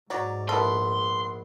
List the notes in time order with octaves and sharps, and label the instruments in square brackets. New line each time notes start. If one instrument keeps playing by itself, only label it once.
[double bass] G#2 [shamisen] F#3 [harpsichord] C#5 D5 A#5
[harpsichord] A#1 B3 E4 [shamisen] A4 [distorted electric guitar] C6